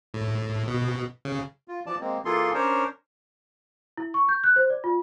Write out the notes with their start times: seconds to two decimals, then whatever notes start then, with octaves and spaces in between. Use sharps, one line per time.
0.14 A2
0.67 B2
1.25 C#3
1.68 F4
1.86 E3 F3 D5 A5
2.00 G#3 A#3 C4
2.25 E3 A#3 F4 G#4 A4 C6
2.54 C#4 D4 A#4 C5 C#5
3.97 E4
4.14 C#6
4.29 G6
4.44 F#6
4.56 C5
4.70 D5
4.84 F4